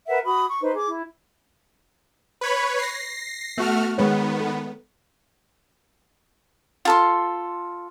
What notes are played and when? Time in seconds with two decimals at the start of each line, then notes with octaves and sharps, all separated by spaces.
0.08 A#4 B4 E5 F#5
0.25 F#4 B5 D#6
0.49 C#6
0.61 D#4 B4 C5
0.75 G#4 D6
0.88 E4
2.41 B4 C#5 B5
2.78 A#6 C7
3.58 A3 B3 F#4 F6
3.98 D#3 G#3 B3 B4 C#5
4.40 A4
6.85 F4 A4 C6